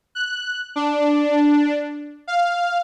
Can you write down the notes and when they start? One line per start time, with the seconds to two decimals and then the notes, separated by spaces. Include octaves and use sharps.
0.15 F#6
0.76 D4
2.27 F5